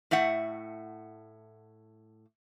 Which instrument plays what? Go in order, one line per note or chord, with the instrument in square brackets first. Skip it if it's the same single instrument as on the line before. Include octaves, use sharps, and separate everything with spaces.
[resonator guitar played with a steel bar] A2 A3 E5 F#5